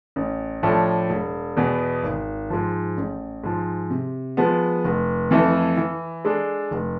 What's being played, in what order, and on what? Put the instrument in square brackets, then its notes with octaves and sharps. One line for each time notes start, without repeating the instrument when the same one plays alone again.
[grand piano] A1
A2 F3 A3 D4
E1
E2 B2 B3
G#1
G#2 F3
A1
G#2 F3
C3
F3 G#3 B3
F1
F2 E3 A3 E4
E3
G#3 D4 A4
F1